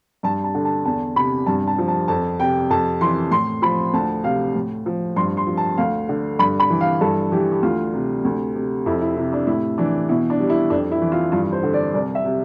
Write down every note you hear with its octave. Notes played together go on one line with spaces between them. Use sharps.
G2 A5
A5
D3
A5
E2 A5
C3 B5
G2 A5
A5
F3
A5
F2 A5
C3 G5
F2 A5
E3 C6
A2 C6
F3 B5
D2 A5
C3 F5
A2
F3
G2 C6
C6
F3
A5
D2 F5
D3
G2 B5
B5
E3
F5
G2 A4
E3 G4
G4
D2 F4
C3
D2
C3
F2 E4
E4
C3 E4
D4
A2 E4
E3 D4
B2 E4
D4
G3
E4
F2 D4
E4
E3
F4
G2 F4
C5
D3
D5
C2 D5
E5
C3